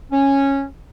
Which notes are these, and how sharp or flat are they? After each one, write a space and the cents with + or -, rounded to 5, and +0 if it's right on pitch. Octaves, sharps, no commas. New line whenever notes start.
C#4 -10